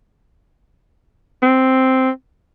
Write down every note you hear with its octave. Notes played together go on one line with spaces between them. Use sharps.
C4